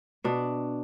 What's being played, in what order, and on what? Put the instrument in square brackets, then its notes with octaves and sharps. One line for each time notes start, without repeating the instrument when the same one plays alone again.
[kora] B2 D4